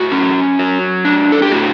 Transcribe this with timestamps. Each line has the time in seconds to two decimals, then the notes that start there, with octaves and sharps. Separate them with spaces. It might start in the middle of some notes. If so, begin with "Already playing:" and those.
Already playing: A2 F#4
0.12 C#4
0.59 F#3
1.05 D4
1.32 A4
1.42 G4
1.52 A2 F#4